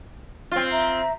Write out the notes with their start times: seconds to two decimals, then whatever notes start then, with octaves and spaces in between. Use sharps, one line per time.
0.52 C4 F4
0.71 E5 A#5